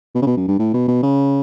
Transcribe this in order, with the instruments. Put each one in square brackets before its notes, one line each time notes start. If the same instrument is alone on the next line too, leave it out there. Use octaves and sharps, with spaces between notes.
[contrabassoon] B2
C#3
B2
F#2
G2
A2
B2
B2
C#3